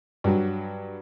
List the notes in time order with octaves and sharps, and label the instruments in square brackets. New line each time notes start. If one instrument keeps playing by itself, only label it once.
[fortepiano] G2 F#3